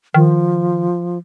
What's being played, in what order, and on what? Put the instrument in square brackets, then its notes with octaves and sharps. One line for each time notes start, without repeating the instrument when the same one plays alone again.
[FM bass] D#3 [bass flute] F3